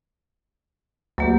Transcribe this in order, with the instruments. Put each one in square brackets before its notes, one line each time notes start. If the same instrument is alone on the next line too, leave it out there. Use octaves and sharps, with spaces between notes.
[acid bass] D2 [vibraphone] F#3 A#3 G4